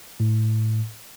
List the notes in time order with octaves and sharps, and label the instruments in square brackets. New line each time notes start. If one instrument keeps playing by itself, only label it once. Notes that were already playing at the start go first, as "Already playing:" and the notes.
[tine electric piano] A2